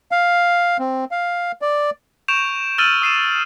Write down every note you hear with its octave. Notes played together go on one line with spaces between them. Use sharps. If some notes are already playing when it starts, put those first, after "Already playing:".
F5
C4
F5
D5
C#6 G6 D7 E7 F7
E6 F6 A6 D#7 E7 F#7
D#6 C7 D#7 E7